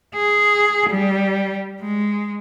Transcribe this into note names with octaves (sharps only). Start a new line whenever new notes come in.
G#4
G3
G#3